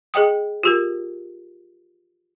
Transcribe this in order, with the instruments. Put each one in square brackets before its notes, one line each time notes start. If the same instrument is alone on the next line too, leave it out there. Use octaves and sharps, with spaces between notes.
[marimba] G#4 D#5 G5 D#6
F4 G4 A#4